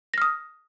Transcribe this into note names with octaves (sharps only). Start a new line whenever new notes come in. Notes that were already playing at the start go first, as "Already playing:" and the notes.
D#6 F6 A#6